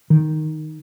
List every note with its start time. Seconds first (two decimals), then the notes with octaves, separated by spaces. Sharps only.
0.10 D#3